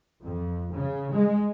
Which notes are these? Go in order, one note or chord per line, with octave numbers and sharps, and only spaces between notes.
F2
C#3
G#3